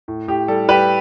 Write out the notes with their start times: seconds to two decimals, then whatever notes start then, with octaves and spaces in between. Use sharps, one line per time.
0.08 A2
0.28 A2 G4
0.48 G3 A4
0.69 G3 G4 B4